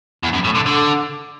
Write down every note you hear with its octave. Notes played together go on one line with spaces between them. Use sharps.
E2
F#2
A2
D3
D3